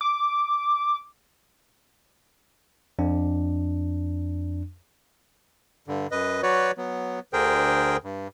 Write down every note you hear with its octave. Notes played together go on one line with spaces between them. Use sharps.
D6
F2 D4
G2 D3
F#2 B4 D#5
F#3 F#4 B4 C#5 D5
F#3 B3
D2 D3 G#4 A#4 C5 G5
G2